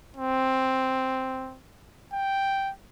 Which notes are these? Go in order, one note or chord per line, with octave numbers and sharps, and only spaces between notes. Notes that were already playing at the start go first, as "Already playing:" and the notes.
C4
G5